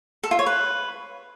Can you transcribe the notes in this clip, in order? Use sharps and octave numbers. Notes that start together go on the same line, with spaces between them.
A4
F4
C#5
B4